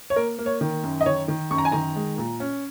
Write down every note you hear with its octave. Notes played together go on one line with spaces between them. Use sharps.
C#5
A#3 A#4
A#3
C#5
D#3
F#2
D#5
D#3 C#5
D#3
F#2 C#6
A#5
G#5
D#3 A#5
G#3
A#2
C#4